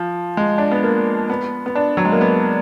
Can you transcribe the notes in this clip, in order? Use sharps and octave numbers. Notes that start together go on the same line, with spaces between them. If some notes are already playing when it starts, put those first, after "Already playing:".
Already playing: F3
G#3
D4
B3
A#3
B3
B3
D4
F#3
G#3
A#3
B3